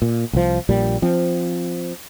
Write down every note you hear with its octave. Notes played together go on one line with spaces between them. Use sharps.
A#2
C2 F3
A#1 A#2 G3
F3 C4